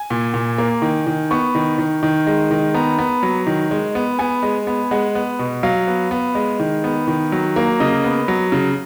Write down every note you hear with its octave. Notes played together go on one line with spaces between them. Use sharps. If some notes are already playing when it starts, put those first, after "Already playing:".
Already playing: G#5
A#2
A#2
A#3
D#3
D#3
B3 C#6
D#3
D#3
D#3
G#3
D#3
B3 A#5
B3
F#3
D#3
G#3
B3
B3 G#5
G#3
B3
G#3 F#5
B3
B2
F#3 F5
B3
B3
G#3
D#3
B3
D#3
F#3
A#3
C#3 D#5
B3
F#3
C#3